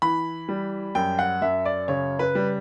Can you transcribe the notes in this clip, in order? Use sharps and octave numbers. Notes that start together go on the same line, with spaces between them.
E3 B5
G3
F#2 G5
F#5
F#2 E5
D5
C#3 C#5
B4
G3